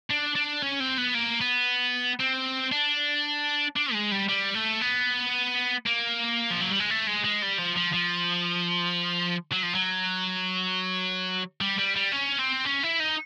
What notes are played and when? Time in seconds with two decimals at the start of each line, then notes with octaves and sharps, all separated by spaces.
0.11 D4
0.36 D4
0.62 C#4
0.80 C4
0.97 B3
1.14 A#3
1.41 B3
2.20 C4
2.72 D4
3.76 D4
3.93 G#3
4.12 G3
4.29 G3
4.54 A3
4.81 B3
5.86 A#3
6.50 F3
6.60 F#3
6.70 G3
6.80 G#3
6.90 A3
7.07 G#3
7.25 G#3
7.43 G3
7.59 F3
7.77 F3
7.94 F3
9.52 F#3
9.63 F3
9.75 F#3
11.61 G3
11.78 G3
11.96 G3
12.12 C#4
12.39 C4
12.65 C#4
12.83 E4
13.00 D#4